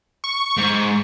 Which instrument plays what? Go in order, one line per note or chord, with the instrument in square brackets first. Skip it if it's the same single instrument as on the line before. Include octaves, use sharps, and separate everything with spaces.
[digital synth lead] C#6
[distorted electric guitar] G#2